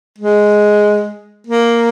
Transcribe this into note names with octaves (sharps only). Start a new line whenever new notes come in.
G#3
A#3